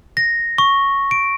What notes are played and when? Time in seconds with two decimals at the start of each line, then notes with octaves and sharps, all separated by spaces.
0.17 A#6
0.58 C#6
1.11 D7